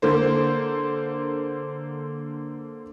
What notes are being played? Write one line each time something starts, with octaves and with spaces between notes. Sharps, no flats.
D3 A#3 C5